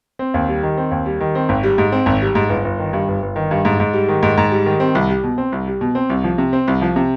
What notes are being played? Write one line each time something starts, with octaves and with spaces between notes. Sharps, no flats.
C4
D#2
G3
D#3
C4
D#2
G3
D#3
C4
G#1
G3
G#2
C4
G#1
G3
G#2
G1
G1
D#3
G2
G1
G1
D#3
G2
G#2
G#2
G3
D#3
G#2
G#2
G3
D#3
C4
C2
G3
B2
C4
C2
G3
B2
C4
C2
F3
C3
C4
C2
F3
C3